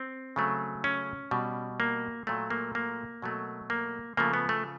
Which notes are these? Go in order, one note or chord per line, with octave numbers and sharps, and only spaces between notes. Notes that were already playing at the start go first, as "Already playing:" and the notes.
Already playing: C4
C#3 F#3 A3
C#4
B2 G3
A#3
A#2 F#3 A3
A#3
A#3
B2 F#3 A3
A#3
C#3 F3 A3 A#3
B3
A3